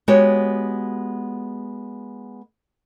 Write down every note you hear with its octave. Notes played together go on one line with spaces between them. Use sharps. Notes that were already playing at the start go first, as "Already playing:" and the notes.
G#3 B3 F#4 G4 C#5